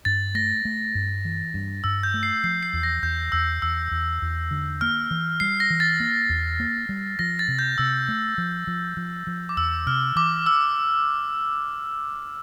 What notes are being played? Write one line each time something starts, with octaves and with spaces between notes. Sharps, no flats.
G2 A6
A3 A#6
A3
G2
E3
G2
G2 E6
G6
A3
C7
F3 C7
C7
E2
A#6
E2 G6
E2 E6
E2 E6
E2
E2
D3
A#3 F6
E3
G3 C7
A#6
E3
A6
A#3
E2
A#3
G3
F3 A#6
A6
C3
G6
C3 E6
A3
F3
F3
F3
F3
D6
E2 E6
C3 F6
E3 D6
E6